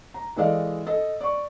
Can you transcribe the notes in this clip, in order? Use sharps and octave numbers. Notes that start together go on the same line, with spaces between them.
A#5
E3 G#3 A4 D5 D#5 F5
A4 D#5
D5 C#6